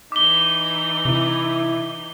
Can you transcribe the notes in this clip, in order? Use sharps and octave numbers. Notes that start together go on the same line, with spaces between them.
E3 D#4 D6 G7
C3 E4